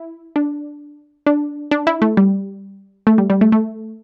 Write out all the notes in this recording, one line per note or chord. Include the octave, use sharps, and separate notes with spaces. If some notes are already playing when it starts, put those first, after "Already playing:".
Already playing: E4
D4
D4
D4
E4
A3
G3
A3
G3
G3
A3
A3